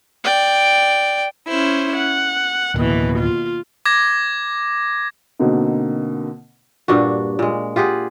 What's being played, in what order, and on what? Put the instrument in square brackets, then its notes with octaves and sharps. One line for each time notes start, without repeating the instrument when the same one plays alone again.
[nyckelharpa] D5 G5
[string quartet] C#4 E4 C5
F#5
[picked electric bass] D1 [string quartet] D#2 B2 E3
[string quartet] F4
[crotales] D6 G#6 A#6
[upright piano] B2 D3 A#3 C4 D#4
[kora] G2 A#2 D4 F#4
A#2 G#3
F4 G4 G#4 F#5